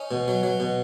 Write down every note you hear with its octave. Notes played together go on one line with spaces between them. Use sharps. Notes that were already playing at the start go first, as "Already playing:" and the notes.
Already playing: C#4 D#4
B2
F#3
F#3
B2